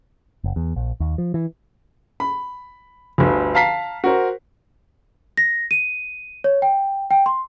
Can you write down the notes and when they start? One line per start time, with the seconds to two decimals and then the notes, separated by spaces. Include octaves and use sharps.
0.44 F#1
0.56 E2
0.76 A#1
1.00 D#2
1.18 F3
1.34 E3
2.20 B5
3.18 G1 D2
3.55 F5 A5 A#5 B6 C7
4.04 F#4 A#4 C5
5.37 A#6
5.71 D#7
6.44 C#5
6.62 G5
7.11 G5
7.26 C6